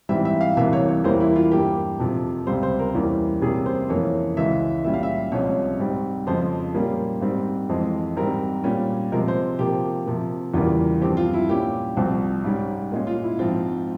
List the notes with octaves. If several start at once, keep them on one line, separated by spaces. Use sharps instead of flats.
G#2 E3 G3 C4 E5
E5
F5
C2 C3 E3 A#3 E5
C#5
C#5
E2 E3 G3 A#3 C#4 C5
E4
F4
G2 G3 A#3 G4
F2 C3 F3
C#2 C3 G3 C5
C5
A#4
E2 E3 G3 A#3 C#4
C3 G3 A#3 C#4 G#4
C5
F2 E3 A#3 C#4 C#5
C#2 C#3 E3 G#3 C#4 E5
A#2 G3 C#4 E5
F5
E5
C2 C3 F3 G#3 C#4 C#5
G#2 G3 C4
F2 C#3 F3 G#3 C5
A#2 G3 A#3 C#4
G#2 G3 C4
F2 E3 G#3 C4
G#2 G3 C4 A#4
A#2 G3 C#4
C3 F3 G#3 A#4
C5
C3 F3 A#3 G4
C3 F3 A#3
E2 C#3 E3 G3 A#3 F4
G2 F3 C4 G4
F4
E4
A#2 G3 C#4 G4
C2 C3 F3 C4
G#2 G3 C#4
A#2 G#3 C#4
F4
E4
G#2 F3 C4 F4